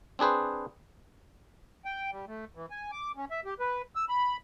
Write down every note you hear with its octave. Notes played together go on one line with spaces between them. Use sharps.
C4 D4 G#4 B4 C5
G5
G3
A3
E3
G#5
D6
C#4
E5
G4
B4
E6
B5